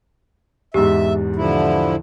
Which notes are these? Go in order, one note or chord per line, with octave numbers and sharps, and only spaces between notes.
E2 G#2 G4 E5
D3 F3 E4